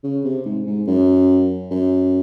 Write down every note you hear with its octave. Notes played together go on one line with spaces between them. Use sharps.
C#3
C3
G#2
G#2
F#2
F#2